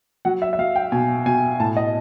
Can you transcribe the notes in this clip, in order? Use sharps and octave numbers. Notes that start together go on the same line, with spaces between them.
F#3 F#5
E5
E5
F#3 F5
G5
B2 G#5
B2 G#5
A2 A5
D#5